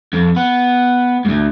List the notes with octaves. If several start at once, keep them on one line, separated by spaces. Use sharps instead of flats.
F2
B3
D2 G#2